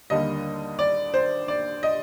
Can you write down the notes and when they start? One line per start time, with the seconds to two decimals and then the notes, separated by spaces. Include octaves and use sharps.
0.10 D#2 D3 G3 A#3 D#5
0.79 D5
1.14 C5
1.48 D5
1.83 D#5